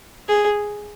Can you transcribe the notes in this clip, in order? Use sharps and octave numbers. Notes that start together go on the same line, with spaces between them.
G#4